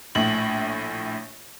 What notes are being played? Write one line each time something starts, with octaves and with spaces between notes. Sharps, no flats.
A#1 A2 F#7